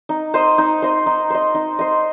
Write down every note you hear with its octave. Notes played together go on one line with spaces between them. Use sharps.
D#4
C5 D#5
D#4
C5 D#5
D#4
C5 D#5
D#4
C5 D#5